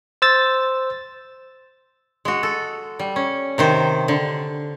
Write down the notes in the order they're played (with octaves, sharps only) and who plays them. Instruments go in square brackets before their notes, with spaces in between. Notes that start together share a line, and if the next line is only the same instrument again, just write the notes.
[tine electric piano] C5 E6 A6
[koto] G#3 F#4
A4
G3
C#4
C3 D#3 C5
D3